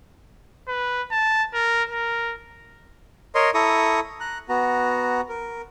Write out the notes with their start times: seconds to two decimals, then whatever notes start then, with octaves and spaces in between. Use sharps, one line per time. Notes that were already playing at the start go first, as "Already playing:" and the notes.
0.68 B4
1.11 A5
1.54 A#4
1.89 A#4
3.35 A#4 C#5 D#5 C6
3.54 E4 A4 A#5 C#6 D#6
4.20 A#5 F#6
4.49 B3 F#4 A#5
5.29 A#4